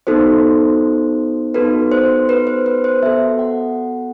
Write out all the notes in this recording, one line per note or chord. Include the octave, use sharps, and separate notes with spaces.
B3 D#4 F#4 A4 C5
B3 D#4 F#4 A4 B4
C5
B4
C5
B4
C5
B3 F#4 A4 E5
F#5